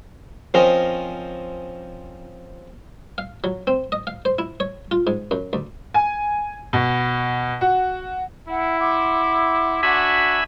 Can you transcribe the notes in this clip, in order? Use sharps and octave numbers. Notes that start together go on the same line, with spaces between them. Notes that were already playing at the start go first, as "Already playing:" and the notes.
F3 C4 C#4 A#4 D#5
F5
F#3
C4
D#5
F5
C5
E4
C#5
F4
G#2
F#2
D2
G#5
B2
F#4
E4 F#5
F#5 C6 D6
D4 F#4 E5 G#5 B5